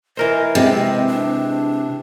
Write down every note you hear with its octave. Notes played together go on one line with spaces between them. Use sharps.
E3 A#4 C5 D#5
C3 G#3 C4 G4
D4